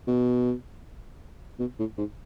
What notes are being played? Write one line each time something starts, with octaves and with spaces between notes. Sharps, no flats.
B2
B2
A2
G#2